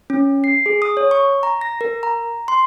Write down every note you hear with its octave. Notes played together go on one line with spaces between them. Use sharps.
C#4
C7
G#4
D#6
C#5
C#6
A#5
A#6
A#4
A#5
C6